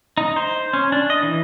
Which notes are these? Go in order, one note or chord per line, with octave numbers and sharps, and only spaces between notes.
D#4
C5
C#4
D4
D#5
E3